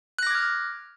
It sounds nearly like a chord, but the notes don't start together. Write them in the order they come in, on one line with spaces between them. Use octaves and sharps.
F#6 A#6 D6 G#6 F6